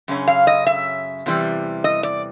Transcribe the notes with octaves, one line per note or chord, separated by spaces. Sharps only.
F#2 C#3 C#4
F5
D#5
E5
E2 C3 E3 G3
D#5
D5